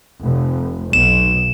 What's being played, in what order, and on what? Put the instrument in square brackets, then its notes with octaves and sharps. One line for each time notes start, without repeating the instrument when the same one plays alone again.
[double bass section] F1
[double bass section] B1 [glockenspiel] E7